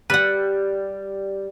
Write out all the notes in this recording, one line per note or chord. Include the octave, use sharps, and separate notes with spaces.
G3 B4 F#5